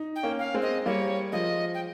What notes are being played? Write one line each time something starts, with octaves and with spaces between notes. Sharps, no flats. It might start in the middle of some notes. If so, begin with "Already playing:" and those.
Already playing: D#4
G5
A#3 C#4
F5
G#3 C4
D#5
G3 A#3 C#5
F3 G#3 D#5
G5